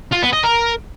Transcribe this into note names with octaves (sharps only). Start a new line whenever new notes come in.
F4
B3
D#5
A#4